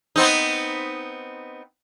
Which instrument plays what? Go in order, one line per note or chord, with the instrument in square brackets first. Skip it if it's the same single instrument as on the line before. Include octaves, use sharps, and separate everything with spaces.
[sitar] B3 C4 D#4